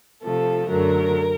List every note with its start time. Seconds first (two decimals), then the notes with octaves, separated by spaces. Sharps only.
0.23 C3 F3 A3 A4
0.68 F#2 D3 F#3 A3 A#4